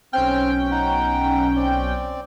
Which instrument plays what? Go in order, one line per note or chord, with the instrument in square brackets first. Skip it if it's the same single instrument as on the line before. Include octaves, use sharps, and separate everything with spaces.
[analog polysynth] B1 C#4 G5 [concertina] C4 F6
[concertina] D#4 F#5
C4 D5